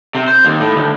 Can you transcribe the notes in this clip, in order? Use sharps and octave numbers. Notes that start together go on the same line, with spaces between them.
C3
C5
D#2
A2
D2